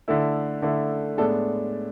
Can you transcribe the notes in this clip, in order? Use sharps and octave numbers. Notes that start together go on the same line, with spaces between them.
D3 A3 E4
D3 A3 E4
A2 G#3 B3 D4 A4